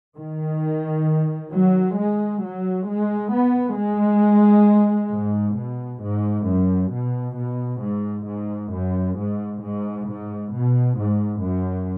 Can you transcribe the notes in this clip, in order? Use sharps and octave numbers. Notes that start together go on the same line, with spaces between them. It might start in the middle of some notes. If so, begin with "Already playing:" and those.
D#3
F#3
G#3
F#3
G#3
B3
G#3
G#2
B2
G#2
F#2
B2
B2
G#2
G#2
F#2
G#2
G#2
G#2
B2
G#2
F#2